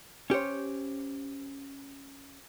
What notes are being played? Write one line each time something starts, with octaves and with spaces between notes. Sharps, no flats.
C#4 G4 C5 C#5